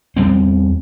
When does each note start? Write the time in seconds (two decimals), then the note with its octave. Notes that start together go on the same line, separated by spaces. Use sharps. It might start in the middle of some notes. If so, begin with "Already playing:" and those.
0.17 E2 G3 C4